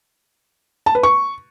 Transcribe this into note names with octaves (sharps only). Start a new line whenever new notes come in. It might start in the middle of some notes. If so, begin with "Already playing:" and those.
A5
B4
C#6